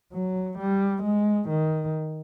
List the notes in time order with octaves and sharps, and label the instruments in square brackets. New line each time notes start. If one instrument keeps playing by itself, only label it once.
[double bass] F#3
G3
G#3
D#3